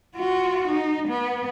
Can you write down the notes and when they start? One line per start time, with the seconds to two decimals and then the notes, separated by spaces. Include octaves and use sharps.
0.16 F4 F#4
0.68 D#4
1.08 B3